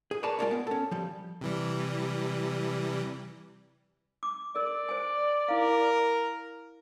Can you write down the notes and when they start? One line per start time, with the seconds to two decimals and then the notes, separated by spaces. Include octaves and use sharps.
0.11 G#4
0.23 A#4 B4 C#5 D5 G#5 A5
0.39 G#3 C4 F4 A#4 C#5 D5
0.51 B3
0.67 C#4 A4
0.91 F3 G3
1.41 C3 E3 G3
4.23 D6
4.56 A#4 D5
4.89 C5 G#5
5.48 E4 A#4 F5